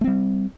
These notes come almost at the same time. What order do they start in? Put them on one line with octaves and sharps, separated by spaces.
A3 C4 G3